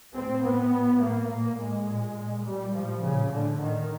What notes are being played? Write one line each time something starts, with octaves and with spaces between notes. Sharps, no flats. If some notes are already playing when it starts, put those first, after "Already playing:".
A2 C4
A2 B3
A#2
A2 A#3
A#2 A#3
A2 G#3
A#2
A#2
A#2 G3
A2 F3
A#2 C#3
A2 D3
A2 D#3